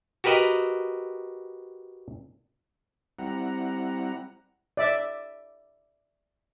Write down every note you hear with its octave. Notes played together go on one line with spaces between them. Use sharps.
F#4 G4 A#4 B4 D#5
G3 C4 E4 F#5 A#5
D5 E5